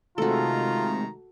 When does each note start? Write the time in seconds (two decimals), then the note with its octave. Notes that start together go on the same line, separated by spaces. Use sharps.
0.18 C3 D#3 G#3 A3 F4 F#4 A4 A#5